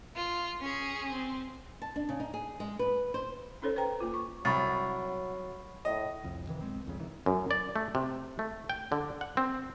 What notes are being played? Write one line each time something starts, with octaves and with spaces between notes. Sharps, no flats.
F4
C#4 G#4
C4
A5
D4
C#3
D#4
G#4
G#3
B4
C5
C#4 D#4 A4 C5 C#5
B4 C5 G5 A#5
A#3 F4
C#6
C2 F#3 B5 C#6 A6
A2 D#5
C2 F2
C3 D#3 E3
B1 G#2 G#3 C4
C2 F2 C#3
C2 D#3 E3
F#2
D5
A3
C3
A3
G5
D3
F#5
C4